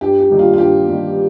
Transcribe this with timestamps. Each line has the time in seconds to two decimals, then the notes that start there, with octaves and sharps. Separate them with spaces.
0.01 G2 G4
0.20 G4
0.29 D#3 G3 A#3
0.39 F4
0.53 F4
0.58 G2 G4
0.87 D#3 G3 A#3